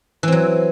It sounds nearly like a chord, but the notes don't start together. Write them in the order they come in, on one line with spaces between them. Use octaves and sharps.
E3 C4 F#3